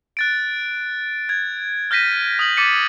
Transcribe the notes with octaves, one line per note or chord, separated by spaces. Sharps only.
F#6 A6 D7
G#6
F6 G6 A#6 B6 D#7
D#6 F#7
D6 A6 B6 C#7 D#7